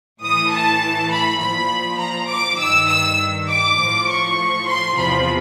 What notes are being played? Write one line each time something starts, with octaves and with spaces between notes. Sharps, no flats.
A2 E3 D#6
A5
B5
A#2 F3 B5
A#5
D6
G2 D#3 E6
E6
D6
A2 F3
C#6
C6
E2 C3 F3 B5